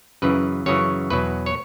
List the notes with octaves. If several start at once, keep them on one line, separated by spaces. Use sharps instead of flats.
F#2 C#3 E3 B4
F#2 C#3 E3 C#5
E2 B2 F#3 B4
C#5